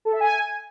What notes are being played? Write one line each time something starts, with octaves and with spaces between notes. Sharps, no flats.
A4
E5
G#5